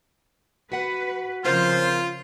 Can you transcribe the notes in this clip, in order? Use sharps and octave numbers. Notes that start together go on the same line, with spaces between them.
F#4 B4 F#5
C#3 F3 C4 F4 A#4 C5